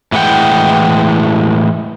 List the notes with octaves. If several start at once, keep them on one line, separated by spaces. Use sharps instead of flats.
A2 E3 G#3 F#5 G5